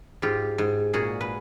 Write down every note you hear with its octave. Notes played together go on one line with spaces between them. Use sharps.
G#2 F4 G4
G#2
A#2 F#4 G#4
B4